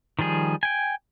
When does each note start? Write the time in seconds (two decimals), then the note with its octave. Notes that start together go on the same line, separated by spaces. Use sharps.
0.19 D#3 F3 G3 G#4
0.63 G5 G#5